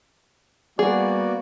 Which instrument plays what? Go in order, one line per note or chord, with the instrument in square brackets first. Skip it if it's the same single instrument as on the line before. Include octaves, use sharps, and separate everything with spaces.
[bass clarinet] G3 [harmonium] A#3 B3 F#4 [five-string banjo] G#4 [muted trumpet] D5